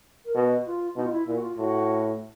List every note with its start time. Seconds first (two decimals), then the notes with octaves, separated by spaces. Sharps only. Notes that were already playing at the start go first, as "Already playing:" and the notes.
0.25 A#4
0.35 B2 B4
0.66 F4
0.96 B2 D#4
1.05 F4
1.12 E4
1.26 A#2 E4
1.35 F#4
1.42 F4
1.57 A2 F#4